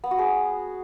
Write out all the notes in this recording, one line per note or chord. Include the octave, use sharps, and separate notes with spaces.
B3
F#4
G#4